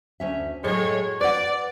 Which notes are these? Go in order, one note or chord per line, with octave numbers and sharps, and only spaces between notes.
D2 C#4 E5
A2 F#3 G#3 A4 C#5
B4 D5 F#5